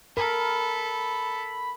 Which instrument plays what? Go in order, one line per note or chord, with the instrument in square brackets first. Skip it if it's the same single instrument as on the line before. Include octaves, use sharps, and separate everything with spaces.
[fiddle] A4 [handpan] A#4 [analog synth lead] B5